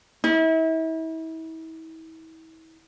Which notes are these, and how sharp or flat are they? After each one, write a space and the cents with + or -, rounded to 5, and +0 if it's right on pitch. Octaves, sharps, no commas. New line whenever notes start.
E4 -35